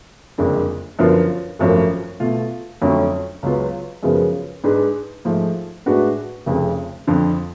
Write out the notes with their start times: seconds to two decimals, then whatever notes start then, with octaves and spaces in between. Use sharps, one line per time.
0.38 F#1 F2 D3 G#3 D4
0.99 F#2 D3 F3 B3 F4
1.59 G#1 F#2 F3 A3 C#4
2.20 B2 A3 F4
2.81 F2 D3 F#3 A3 C#4
3.43 C#2 C#3 F#3 B3 F4
4.03 F#2 C#3 F3 G#3 B3
4.64 G#2 G#3 D4 G#4 B4
5.25 G#2 F3 A3
5.86 A2 G#3 D4 F#4 B4
6.46 F1 F2 C#3
7.07 F2 D3 F3